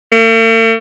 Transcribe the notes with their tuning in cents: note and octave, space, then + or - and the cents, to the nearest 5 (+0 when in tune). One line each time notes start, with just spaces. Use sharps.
A3 +45